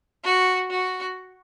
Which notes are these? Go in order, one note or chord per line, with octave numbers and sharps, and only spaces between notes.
F#4
F#4